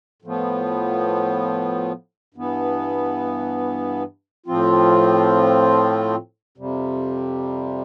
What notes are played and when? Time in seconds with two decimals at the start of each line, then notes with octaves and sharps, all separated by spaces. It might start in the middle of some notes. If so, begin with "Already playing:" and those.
0.22 A2 F3 B3
2.34 G2 E3 B3
4.46 A2 F3 C4 F4
6.58 F2 C3 G3